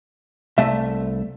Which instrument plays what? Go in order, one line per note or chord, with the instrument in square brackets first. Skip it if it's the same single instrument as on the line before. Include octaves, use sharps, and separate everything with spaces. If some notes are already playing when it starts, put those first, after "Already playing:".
[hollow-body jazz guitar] C2 A3 E5